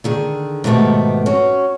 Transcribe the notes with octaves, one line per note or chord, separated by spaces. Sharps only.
D3 D#3 G#4
G#2 B2 D#3 A3 B3 G4
C#4 F#4